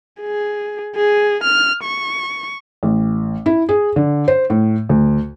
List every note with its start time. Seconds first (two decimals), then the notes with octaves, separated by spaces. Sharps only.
0.21 G#4
0.95 G#4
1.44 F6
1.84 C#6
2.83 A1
3.46 E4
3.69 G#4
3.96 D3
4.28 C5
4.50 A2
4.89 D2